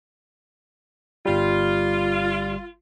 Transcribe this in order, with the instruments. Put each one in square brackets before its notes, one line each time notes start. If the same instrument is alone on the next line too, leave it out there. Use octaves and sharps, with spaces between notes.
[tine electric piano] G1 G3 [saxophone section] F4